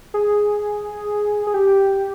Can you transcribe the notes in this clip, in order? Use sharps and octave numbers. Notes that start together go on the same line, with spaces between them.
G#4
G#4
G4